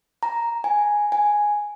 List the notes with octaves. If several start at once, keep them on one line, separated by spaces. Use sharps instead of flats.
A#5
G#5
G#5